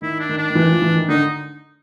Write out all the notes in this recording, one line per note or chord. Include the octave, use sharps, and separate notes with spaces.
D#3 E4
D4
D#3
D4
D#3
E3
F3
E3
D#3
D3 D#4